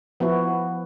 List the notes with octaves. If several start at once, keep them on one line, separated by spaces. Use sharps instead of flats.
F3 B3 E4 F#4